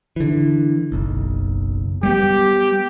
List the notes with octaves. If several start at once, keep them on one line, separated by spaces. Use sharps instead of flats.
D3 E3
F#1 B1
G3 A#3 B3 G4